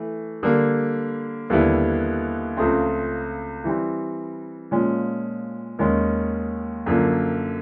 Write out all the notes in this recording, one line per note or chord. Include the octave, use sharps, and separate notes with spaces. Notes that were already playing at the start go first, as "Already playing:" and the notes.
Already playing: E3 A3
D3 G3 A#3
D#2 D3 G3 B3 E4
C#2 C#3 F3 A3 C4
E3 G3 C4
A#2 F3 G#3 C#4
D#2 D#3 G#3 C#4
F#2 D3 F3 A#3